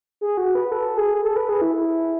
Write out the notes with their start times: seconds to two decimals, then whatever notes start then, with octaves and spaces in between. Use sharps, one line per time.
0.21 G#4
0.37 F#4
0.55 B4
0.72 A4
0.97 G#4
1.24 A4
1.36 B4
1.49 G#4
1.61 E4